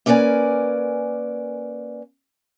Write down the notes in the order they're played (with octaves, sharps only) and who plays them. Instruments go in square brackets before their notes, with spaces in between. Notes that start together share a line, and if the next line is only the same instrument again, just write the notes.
[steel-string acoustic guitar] A#3 C#4 A#4 B4 D5 G#5